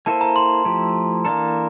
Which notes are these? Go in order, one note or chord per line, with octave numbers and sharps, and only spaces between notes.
A#3 E4 A4 C5 A5
A#5
C6
F3 A3 E4 G4
E3 A#3 D4 A4 A#5